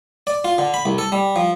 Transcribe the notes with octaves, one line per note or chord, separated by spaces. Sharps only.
D5
F4
D3
B5
C2
A4
G3
F3